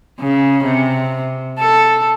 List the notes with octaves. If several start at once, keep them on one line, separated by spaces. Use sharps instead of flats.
C#3
C3
A4